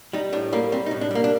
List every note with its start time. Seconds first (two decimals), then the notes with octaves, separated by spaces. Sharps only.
0.13 G3 D#4
0.33 A2 D4
0.53 G3 A#3
0.72 G3 C4
0.86 D#4
0.91 A2
1.01 D4
1.11 G3 A#3
1.24 D4